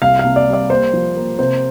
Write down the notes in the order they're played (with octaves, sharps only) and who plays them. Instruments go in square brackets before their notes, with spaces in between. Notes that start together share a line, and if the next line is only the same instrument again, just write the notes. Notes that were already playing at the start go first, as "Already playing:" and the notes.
[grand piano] C2 F5
F5
C3
D5
G3
D5
A#3 C5
F3
A#3
C3 C5